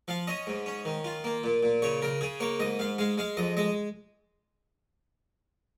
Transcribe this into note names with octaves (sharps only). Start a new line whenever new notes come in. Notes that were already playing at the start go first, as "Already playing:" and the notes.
F3 F5
C#4 D#5
G#2
C#4
D#3
F4
A#3
A#2
A#2
C#3 C#5
C#3 A#4
C#3 G#4
A#3 C#5
G#2 D#5
G#2 F5
G#3 F5
G#3 F5
F2 D#5
G#3 D#5